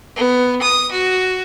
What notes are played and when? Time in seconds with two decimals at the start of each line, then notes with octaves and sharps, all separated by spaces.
0.16 B3
0.62 D#6
0.91 F#4